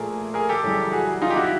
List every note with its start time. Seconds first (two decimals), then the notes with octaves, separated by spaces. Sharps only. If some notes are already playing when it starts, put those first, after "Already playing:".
Already playing: A#2 F3 A3 G#4 A#4
0.34 G#4 A#4
0.49 G4 A4
0.64 F#2 C#3 E3 G3
0.92 F#4 G#4
1.22 D#4 F4
1.30 G4
1.36 E4 F#4